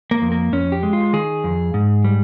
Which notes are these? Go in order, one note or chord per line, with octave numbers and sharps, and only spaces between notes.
A#3
F2
A#3
F2 C#4
G4
G#3
F4
D#3 G#4
F2
G#2
G3